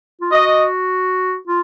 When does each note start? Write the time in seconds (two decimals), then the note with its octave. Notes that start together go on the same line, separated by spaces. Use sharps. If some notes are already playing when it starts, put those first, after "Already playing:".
0.21 F4
0.31 F#4 D#5
1.48 F4